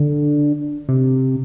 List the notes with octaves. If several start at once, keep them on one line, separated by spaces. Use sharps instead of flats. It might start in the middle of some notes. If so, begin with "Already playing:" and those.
Already playing: D3
C3